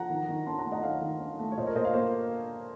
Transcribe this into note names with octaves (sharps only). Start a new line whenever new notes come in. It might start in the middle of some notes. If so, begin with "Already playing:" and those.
Already playing: F3 F#5 A#5
D#3
D#3
C#4 A5 C6
F#5 A#5
A3
D#5 F#5
D#3 C#5 F5
D#3
C#4
A3
C#5
A#2 C5 D#5
A#4 C#5
A#2 C5 D#5
C#5 F5
A#3 C5